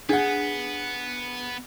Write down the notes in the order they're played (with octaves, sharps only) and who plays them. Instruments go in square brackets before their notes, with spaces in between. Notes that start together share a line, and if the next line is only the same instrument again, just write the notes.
[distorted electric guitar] B3 [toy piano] D4 [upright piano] G#4 F#5